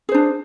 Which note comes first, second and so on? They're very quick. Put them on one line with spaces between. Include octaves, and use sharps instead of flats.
G#4 C5 D4